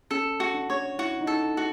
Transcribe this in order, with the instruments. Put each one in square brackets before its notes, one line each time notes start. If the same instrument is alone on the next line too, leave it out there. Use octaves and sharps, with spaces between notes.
[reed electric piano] C#4 [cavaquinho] A4
[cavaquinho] F#4
[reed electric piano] D4
[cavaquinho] C#5
[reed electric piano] E4 [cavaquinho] F#4
[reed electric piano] D#4
[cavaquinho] A4
F#4